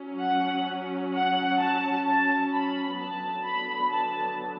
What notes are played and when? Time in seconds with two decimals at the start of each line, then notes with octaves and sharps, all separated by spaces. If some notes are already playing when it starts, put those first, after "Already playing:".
Already playing: F#3 C#4
0.19 F#5
1.13 F#5
1.58 A5
2.05 A5
2.51 B5
2.98 D3 F#3 B3 A5
3.44 B5
3.90 A5